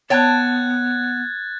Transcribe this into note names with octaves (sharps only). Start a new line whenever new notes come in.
B3 C#5 G5 A5 F#6 G#6 A6